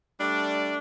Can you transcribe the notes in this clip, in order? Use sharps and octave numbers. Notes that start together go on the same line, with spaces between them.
G3 A3 D4